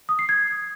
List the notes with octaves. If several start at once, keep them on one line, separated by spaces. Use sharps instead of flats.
D#6
C7
G#6